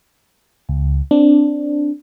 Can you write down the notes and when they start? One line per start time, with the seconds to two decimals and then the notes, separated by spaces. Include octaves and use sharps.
0.69 C#2
1.11 C4 D4